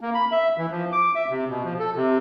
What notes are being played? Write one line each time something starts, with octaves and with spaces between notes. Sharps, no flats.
A#3
B5
E5
E3
F3
D6
E5
C3
B2
F3
A4
C3